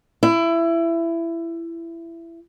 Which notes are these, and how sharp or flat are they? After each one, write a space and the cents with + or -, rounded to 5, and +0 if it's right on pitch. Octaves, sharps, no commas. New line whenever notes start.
E4 +20